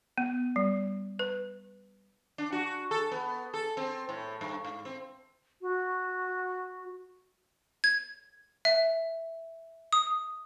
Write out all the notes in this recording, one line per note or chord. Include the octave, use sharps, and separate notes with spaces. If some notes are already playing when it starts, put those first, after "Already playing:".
B3
G3
B4
D4
F#4
A4
B3
A4
C4
A2
G2
G#2
C4
F#4
G#6
E5
D#6